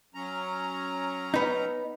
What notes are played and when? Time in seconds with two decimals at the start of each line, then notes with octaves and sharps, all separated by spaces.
0.15 F#3 C#4 A#5
1.34 B3 D#4